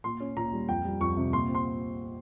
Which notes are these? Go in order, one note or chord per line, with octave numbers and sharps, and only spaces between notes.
A#2 C6
C#4
A#2 A#5
G3
F2 G5
G3
F2 C#6
C3
A#2 C6
C4
C6